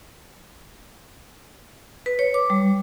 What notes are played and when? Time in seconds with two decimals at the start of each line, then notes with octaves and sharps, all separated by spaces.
2.06 B4
2.19 C#5
2.34 D6
2.50 G3